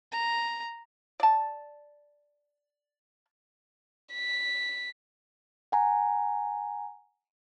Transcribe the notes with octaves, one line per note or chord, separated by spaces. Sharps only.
A#5
D5 A5
B6
F#5 G#5 A#5